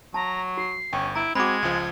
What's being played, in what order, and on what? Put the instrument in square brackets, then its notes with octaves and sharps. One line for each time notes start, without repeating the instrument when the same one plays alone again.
[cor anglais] F#3 [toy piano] A5 [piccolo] A#5
[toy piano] F#4 [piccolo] C7
[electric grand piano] G1 [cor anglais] C#4 [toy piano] G5
[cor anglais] E4 [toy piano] A#5 [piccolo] D7
[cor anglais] G#3 [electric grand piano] C4 F#4 [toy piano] B5 D6 [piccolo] G#6
[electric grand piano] C#2 F3